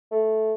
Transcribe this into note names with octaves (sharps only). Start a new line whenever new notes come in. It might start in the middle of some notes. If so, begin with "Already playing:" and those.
A3